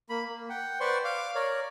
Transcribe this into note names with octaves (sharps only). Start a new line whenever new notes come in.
A#3 B5
A#3
F#5 G5
B4 C5 D5 C6 C#6
F5 D6
A#4 C#5 D5